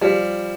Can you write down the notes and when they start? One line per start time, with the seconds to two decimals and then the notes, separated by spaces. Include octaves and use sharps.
0.01 F3 G3